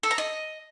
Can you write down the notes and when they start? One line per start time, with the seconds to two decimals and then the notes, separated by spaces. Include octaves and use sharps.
0.03 A4
0.11 A#5
0.18 D#5